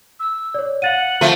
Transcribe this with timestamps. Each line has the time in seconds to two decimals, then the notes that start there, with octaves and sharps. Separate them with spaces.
0.20 E6
0.54 C#5 D5
0.82 F5 F#5 A6 D#7
1.21 F3 A3